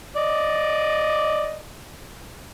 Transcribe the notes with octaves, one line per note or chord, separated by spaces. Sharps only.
D5 D#5